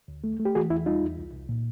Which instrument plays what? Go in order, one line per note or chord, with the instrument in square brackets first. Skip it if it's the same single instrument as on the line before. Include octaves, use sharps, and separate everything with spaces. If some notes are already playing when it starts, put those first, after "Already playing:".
[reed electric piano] D2
A3
A3
G4
E3 F#4 G#4
E2 E4
G3 D#4 F4
E2
C2
C2
A#2